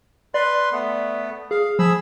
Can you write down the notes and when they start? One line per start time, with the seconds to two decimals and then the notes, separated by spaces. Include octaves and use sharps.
0.34 B4 D5 C6
0.72 A3 B3
1.51 G#4 F5
1.79 F3 G#4 B5 E6